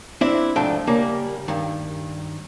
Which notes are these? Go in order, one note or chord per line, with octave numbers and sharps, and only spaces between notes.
C4 D4 E4 E5
C2 G#2 F3 A3 D4 G5
C#3 G3 A#3
G2 D#3